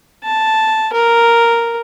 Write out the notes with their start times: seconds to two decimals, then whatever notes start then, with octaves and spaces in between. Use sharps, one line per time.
0.24 A5
0.93 A#4